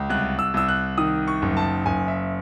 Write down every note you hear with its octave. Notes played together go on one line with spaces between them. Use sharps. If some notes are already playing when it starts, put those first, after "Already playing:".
Already playing: C#2
C2 F#6
E6
C2 E6
F#6
D#3 D#6
C#6
F#1
A5
F#1 G#5
E5